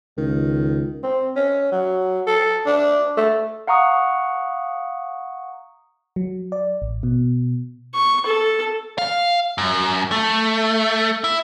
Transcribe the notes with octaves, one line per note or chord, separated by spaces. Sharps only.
C#2 D#3
C4
C#4
F#3
A4
D4
A3
F5 F#5 A#5 C#6 D#6
F#3
D5
A1
B2
C#6
A4
F5
F#2
A3
E4